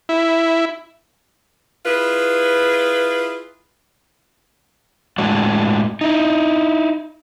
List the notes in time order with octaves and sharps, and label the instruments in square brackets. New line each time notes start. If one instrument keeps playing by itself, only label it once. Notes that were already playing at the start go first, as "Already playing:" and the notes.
[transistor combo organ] E4
[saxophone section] E4 F4 G#4 B4
[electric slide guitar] A2 G#3 D4 F#4
D#4 E4